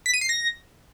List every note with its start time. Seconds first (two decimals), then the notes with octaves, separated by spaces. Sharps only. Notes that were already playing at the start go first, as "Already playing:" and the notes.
0.06 B6
0.14 D#7
0.21 C7
0.29 A#6